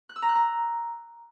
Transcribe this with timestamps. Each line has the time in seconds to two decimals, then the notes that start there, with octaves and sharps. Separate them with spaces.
0.09 F#6
0.16 E6
0.22 A#5
0.29 F#6
0.35 A#5